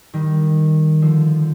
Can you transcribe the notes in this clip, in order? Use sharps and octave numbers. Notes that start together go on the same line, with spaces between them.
D#3 G3
D3 F3